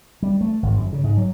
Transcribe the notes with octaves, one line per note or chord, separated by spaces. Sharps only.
G3
A3
G#1
F#2
C#3
G#2
F#3